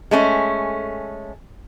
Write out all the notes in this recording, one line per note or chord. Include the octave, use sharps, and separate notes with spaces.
G#3 A3 C#4